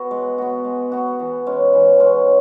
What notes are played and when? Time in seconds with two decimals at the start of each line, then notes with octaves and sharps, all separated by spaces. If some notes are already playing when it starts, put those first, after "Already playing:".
Already playing: B3 F#4
0.11 G#3
0.38 B3 F#4
0.65 G#3
0.92 B3 F#4
1.20 E3
1.46 G#3 C#4
1.73 E3
2.00 G#3 C#4